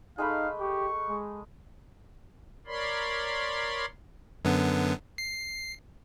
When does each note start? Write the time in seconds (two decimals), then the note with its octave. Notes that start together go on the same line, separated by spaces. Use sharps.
0.18 G#3 A3 D#4 F5 B5
0.60 G4 C#6
1.09 G#3
2.67 A#4 C#5 D5 B5 C6
4.45 F#2 D3 B3
5.18 C7